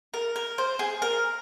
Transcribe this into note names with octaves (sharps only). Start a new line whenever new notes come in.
A#4
A#4
C5
G#4
A#4